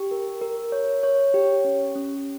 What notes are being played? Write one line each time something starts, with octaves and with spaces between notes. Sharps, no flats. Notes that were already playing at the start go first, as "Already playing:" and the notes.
Already playing: G4
A#4
A#4
C#5
C#5
G4
C#4
C#4